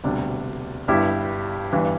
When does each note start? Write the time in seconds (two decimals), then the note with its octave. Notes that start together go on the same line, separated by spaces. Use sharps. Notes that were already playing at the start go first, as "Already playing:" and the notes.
0.04 E1 D2 C3 G3 D4
0.88 G1 G2 G3 E4 G4
1.73 G1 G2 E3 G3